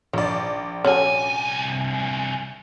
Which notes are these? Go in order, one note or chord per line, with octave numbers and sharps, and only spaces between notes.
A#1 D#3 D5
C2 C#4 F#4 A4 G#5